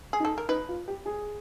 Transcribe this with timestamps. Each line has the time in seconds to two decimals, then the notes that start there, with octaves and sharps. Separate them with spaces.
0.13 G#4
0.20 D#4
0.25 A4
0.38 A#4
0.49 D#4 B4
0.69 F4
0.88 G4
1.06 G#4